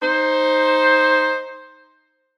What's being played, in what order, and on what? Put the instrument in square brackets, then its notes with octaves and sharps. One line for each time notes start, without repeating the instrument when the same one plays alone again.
[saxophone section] D#4 C5